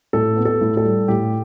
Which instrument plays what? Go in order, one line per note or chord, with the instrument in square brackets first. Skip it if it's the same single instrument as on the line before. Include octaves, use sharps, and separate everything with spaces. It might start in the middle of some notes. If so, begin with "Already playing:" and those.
[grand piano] A2 A4
B3
A4
A2
A4
G3
A2 G4